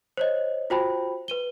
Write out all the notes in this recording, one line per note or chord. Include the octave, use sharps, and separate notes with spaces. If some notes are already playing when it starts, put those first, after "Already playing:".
C5 C#5 D#5
F4 F#4 C5 G5 A5 B5
B4 D#7 G7